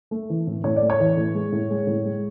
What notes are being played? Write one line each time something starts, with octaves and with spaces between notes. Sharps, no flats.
A3
E3
A2
A2 C#5
D5
A3
C#5
E3
A2
G#3
A2
G#3
A2
G#3